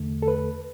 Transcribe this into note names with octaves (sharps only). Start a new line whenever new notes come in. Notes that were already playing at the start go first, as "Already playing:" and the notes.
Already playing: E2 D3 A3
A4
B4